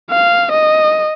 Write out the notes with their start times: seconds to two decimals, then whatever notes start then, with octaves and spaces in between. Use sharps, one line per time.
0.10 F5
0.52 D#5